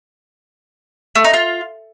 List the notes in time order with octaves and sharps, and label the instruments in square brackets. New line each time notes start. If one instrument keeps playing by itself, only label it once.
[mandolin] A3
D#4
F4